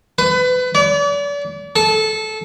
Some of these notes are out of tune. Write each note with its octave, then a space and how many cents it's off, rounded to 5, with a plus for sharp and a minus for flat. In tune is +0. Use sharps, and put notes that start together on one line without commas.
B4 +30
D5 -40
A4 -20